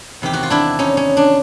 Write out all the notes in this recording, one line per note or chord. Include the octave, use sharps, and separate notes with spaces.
E2 C3 D#3 G4
F#4
F4
D4 E4
C#4 D#4
C#4
D4